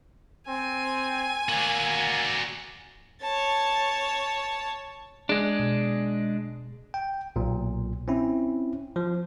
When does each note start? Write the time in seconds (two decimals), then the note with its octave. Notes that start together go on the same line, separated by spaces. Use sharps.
0.48 C4 G#5
1.49 A#3 F#4 D5
3.21 C#5 A5
5.29 G#3 D4 G#4
5.59 B2
6.94 G5
7.36 B1 A#2
8.08 C4 C#4 E4
8.96 F3